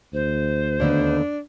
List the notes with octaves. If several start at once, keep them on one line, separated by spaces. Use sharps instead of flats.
D2 C5
D#2 D3 B3 D4